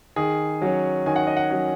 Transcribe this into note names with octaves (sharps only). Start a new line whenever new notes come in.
D#3 G#4
F#3 C#4
D#3 G#5
F#5
D#5
F#5
F#3 C#4